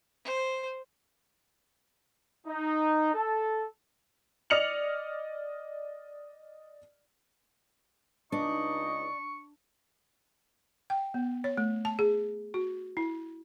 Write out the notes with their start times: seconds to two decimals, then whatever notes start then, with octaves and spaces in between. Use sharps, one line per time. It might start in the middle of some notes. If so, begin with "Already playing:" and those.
0.25 C5
2.47 D#4
3.14 A4
4.50 D5 D#5 F6 C#7 F7 F#7
8.32 C#2 D4 D#4 D#5 C#6
10.90 G5
11.14 B3
11.44 C#5
11.58 A3
11.85 A5
11.99 G#4
12.54 F#4
12.97 E4